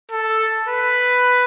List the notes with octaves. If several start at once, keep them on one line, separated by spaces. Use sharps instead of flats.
A4
B4